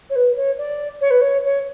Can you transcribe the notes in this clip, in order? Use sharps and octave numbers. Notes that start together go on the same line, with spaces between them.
C#5
B4
C#5
D5
C#5
B4
C#5
C#5